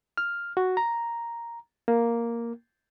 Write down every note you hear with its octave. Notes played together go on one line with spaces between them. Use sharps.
F6
F#4
A#5
A#3